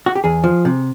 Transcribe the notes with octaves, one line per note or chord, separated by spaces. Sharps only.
F#4
G4
E2 G#4
F3
C3